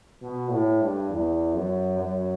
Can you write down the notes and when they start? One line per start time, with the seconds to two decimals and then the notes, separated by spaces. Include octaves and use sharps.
0.22 B2
0.51 A2
0.81 G2
1.10 E2
1.54 F#2
1.98 F#2